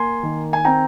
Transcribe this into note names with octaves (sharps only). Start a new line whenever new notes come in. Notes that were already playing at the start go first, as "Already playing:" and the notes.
Already playing: A#3 G#5 C6
D#3
G#5
C4 G5 A#5